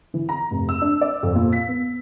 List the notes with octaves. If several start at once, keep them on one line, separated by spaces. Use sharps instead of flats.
E3
A#5
F1
E6
D4
D5
F2
A#2
B6
B3